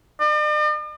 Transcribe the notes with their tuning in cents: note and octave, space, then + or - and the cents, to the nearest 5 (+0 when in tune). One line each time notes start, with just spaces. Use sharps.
D5 +45